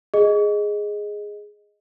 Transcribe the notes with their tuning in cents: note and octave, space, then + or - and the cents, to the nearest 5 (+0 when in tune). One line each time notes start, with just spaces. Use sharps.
G#4 +0 D#5 +0